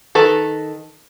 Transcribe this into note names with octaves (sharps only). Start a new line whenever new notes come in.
D#3 A4 B4